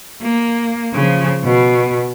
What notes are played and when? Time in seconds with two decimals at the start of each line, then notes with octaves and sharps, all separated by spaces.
0.22 A#3
0.93 C#3 F3
1.44 B2